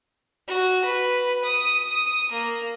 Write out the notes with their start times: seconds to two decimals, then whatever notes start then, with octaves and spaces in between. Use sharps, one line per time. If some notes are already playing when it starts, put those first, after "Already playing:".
0.48 F#4
0.85 B4
1.45 D#6
2.32 A#3